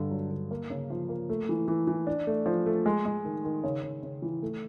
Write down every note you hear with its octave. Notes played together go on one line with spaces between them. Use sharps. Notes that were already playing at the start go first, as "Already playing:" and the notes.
Already playing: G2 D3
F#3
D3
A#3
C#3
F3
A#3
A3
E3
E3
E3
D4
A3
F3
A3
G#3
G#3
D#3
D#3
C#3
C#3
C#3
E3
A3